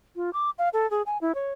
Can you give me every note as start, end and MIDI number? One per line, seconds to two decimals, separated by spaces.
0.16 0.30 65
0.33 0.50 86
0.58 0.69 77
0.73 0.89 69
0.91 1.02 68
1.06 1.18 80
1.21 1.34 64
1.35 1.52 73